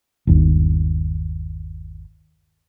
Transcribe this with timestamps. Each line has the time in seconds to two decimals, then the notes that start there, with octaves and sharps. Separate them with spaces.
0.27 G1 D#2